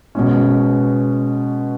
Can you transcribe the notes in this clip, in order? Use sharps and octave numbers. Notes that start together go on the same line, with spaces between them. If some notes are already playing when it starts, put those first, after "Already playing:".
B2 G#3 C#4